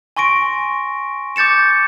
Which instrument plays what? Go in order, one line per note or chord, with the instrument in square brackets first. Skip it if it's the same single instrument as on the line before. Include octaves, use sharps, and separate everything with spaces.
[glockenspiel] G#5 C6 C#6 A#6 D7
D6 G6 A6 C#7 E7